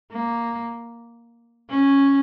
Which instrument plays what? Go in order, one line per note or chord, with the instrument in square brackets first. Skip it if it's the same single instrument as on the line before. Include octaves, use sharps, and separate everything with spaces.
[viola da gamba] A#3
C#4